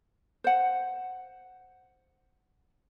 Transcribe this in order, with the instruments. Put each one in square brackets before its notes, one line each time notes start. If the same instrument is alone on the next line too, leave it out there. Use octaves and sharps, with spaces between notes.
[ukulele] C5 F#5